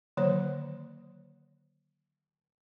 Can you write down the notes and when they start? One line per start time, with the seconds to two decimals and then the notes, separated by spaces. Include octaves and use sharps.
0.17 D3 D#3 F#3 A#3 C5 C#5